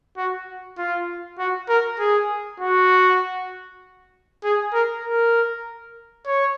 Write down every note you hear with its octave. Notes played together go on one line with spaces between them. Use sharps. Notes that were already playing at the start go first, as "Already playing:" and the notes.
F#4
F4
F#4
A#4
G#4
F#4
G#4
A#4
A#4
C#5